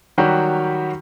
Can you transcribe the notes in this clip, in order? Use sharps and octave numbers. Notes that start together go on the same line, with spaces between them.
D#3 F#3 G3 F#4 G4